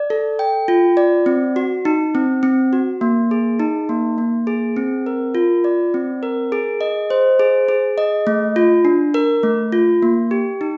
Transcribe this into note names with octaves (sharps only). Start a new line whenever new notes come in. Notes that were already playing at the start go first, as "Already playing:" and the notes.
Already playing: D5
A4
G5
F4
D5
C4
F#4
D#4
C4
C4
F#4
A#3
G#4
D#4
A#3
A#3
G#4
C4
A#4
F4
D5
C4
A#4
G#4
D#5
C5
G#4
G#4
D#5
A3
F4
D4
A#4
A3
F4
A#3
G4
D#4